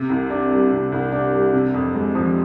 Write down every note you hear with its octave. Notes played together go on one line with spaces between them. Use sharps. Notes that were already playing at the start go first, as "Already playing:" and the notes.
Already playing: C3
C2
D4
G3
C3
C2
D4
G3
C3
F2
G#3
F3